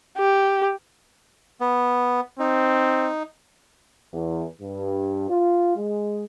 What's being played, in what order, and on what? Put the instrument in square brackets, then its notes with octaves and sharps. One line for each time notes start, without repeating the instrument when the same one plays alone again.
[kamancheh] G4
[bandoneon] B3
[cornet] C4 [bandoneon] D#4
[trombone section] E2
G2
F4
G#3